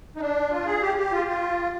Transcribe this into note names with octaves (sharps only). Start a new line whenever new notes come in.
D#4
D4
F4
G#4
G4
G4
F4
F4